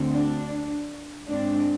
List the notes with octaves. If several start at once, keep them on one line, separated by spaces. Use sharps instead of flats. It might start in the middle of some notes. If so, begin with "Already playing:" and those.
Already playing: D2 D3 A3 C4
D4
G#2 G#3 C4 D4